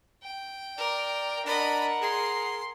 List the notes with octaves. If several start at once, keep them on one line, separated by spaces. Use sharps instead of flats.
G5
A#4 D5
D4 A#4 D#5 F#5 B5
G#4 C6